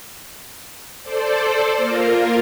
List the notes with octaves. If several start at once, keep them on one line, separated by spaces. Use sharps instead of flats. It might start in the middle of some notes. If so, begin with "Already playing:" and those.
A4 C5 D5
A#3 F4 A#4